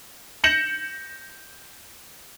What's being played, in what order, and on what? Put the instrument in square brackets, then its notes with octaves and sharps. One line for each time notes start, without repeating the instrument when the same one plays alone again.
[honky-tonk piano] G6 A#6 C#7 E7 F#7